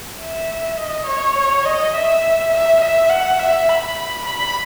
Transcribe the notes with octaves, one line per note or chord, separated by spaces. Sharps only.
E5
D#5
C#5
D#5
E5
E5
E5
F#5
E5
B5
B5